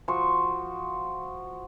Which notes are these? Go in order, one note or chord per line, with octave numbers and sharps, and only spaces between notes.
F3 F#4 C6 C#6